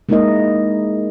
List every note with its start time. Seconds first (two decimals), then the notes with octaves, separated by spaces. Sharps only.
0.09 G#3 A#3 D#4 E4 A#4 D#5